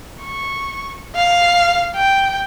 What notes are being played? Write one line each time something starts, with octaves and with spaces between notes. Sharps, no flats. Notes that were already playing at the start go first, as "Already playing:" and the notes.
C#6
F5
G5